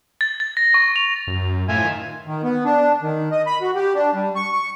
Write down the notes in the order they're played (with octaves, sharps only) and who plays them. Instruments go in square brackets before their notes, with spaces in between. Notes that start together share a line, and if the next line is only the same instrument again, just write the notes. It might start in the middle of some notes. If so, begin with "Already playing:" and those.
[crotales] A6
A6
A#6
C#6
F7
[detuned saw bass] F#2
[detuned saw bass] A2 [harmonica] F4 E5 G#5
[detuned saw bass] D#3
[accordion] D#3
B3
D4
D#3
D#5
B5
F#4
G4
D4
G3
C#6
C#6